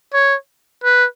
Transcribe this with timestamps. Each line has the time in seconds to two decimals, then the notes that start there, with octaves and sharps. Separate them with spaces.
0.14 C#5
0.84 B4